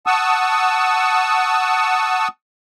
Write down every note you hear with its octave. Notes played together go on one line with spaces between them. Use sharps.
F#5 A5 C#6 D#6 E6